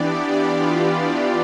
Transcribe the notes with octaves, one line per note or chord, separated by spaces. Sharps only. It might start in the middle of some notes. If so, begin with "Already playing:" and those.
Already playing: E3 B3 D4 G4 D5
F4